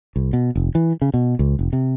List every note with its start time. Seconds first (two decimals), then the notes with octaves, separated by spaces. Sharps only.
0.16 C2
0.33 B2
0.55 F1
0.75 E3
1.02 C#3
1.14 B2
1.39 C#2
1.59 F1
1.73 C3